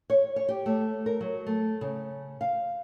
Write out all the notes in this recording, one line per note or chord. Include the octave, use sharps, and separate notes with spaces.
C#5
C#5
G4
A3
A#4
F#3
A3
C#3
F5